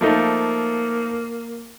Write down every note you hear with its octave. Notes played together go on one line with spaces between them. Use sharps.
F3 A3 A#3 D#4